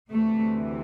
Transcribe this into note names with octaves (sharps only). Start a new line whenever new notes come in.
D2 C3 E3 A3